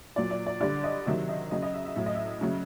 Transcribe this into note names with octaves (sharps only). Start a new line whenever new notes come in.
A#2 F#3 D5
D5
D5
D3 G3 D5
D#5
C3 D#3 F#3 E5
D#5
C#3 F#3 D#5
D#5
E5
E5
A2 F#3 E5
D#5
E5
C#3 F#3